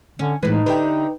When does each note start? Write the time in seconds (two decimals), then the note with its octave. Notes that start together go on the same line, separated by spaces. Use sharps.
0.19 D3 C#4
0.43 A2 E3 G#3 D#4 B4
0.66 D3 G4 B4 E5 G5